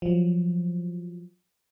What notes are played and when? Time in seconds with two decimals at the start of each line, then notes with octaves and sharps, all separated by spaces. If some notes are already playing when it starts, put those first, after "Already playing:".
0.02 F3 F#3